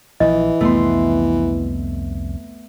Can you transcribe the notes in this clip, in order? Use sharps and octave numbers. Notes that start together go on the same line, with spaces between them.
A#1 E3 F3 D#5
C2 F2 D3 A3 B3 C6